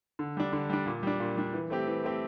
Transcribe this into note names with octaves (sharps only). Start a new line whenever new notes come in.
D3
G3 D4
D3
G3 D4
A#2
G3 D4
A#2
G3 D4
E3
A3 C4 G4
E3
A3 C4 G4